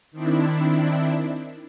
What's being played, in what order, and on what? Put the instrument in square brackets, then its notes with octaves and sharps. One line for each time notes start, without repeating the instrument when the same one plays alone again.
[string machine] D#3 C4 D4 E4